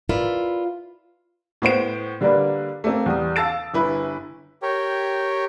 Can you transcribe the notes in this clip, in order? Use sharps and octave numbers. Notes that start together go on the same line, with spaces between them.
E4 F4 A#4 B4 D5
A2 B3 C5 D7
D3 G3 A#3 D4 A#4 B4
A3 A#3 C4
E2 G3 D#6
F5 A5 E6 A6 D7
G1 E4 B4
G4 A#4 C#5 G5